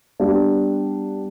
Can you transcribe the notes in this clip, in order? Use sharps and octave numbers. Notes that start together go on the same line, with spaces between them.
G3 B3 D4 G4